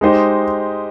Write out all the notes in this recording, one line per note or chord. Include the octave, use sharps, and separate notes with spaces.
G#3 D#4 G4 C5 D#5